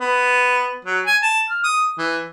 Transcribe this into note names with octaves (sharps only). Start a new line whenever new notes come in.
B3
F#3
G#5
A5
F6
D#6
E3